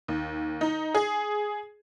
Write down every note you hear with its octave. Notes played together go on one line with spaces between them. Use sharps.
D#2
D#4
G#4